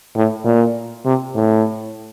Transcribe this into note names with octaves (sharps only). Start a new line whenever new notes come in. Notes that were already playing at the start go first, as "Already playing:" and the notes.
A2
A#2
C3
A2